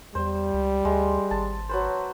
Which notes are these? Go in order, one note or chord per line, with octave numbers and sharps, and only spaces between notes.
E2 G3 C5
C#2
D2 G#3
G#1 A5
F#3 B4 C5